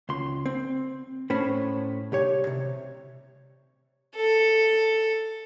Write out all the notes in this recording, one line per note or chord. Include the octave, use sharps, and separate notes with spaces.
C#2 C6
C4
A2 C#4 C5 B5
C2 G4 C#5
C3
A4